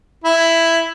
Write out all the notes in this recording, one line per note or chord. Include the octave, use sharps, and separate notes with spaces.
E4